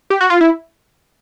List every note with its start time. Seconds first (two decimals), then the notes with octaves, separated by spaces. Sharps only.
0.10 G4
0.21 F#4
0.30 F4
0.41 E4